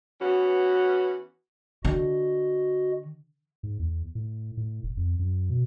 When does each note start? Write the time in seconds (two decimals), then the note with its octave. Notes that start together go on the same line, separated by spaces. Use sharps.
0.22 E3 B3 C#4 F#4
1.85 D3 F#4 D#5
3.63 G#2
3.79 E2
4.15 A2
4.57 A2
4.83 E1
4.97 F2
5.19 F#2
5.50 B2